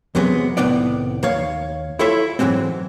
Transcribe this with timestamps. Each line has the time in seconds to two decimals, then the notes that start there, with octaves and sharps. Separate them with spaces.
0.15 E2 C3 F#3 G#3 B3
0.57 C2 A2 D#3 B3 D5
1.23 D#2 D#3 C#5 F5
1.99 E4 F4 A4 C#5 E5
2.39 G#2 E3 F#3 G#3 C4